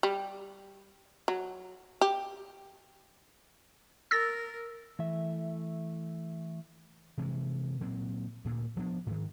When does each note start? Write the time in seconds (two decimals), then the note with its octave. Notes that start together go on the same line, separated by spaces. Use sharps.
0.03 G3
1.28 F#3
2.01 G4
4.11 A#4 E6 A6 A#6
4.99 E3 A3 E5
7.18 C3 E3 G#3
7.81 A#2 F#3 C4
8.45 D2 A#2
8.77 F3 B3 C#4 D4
9.07 G#2 D#3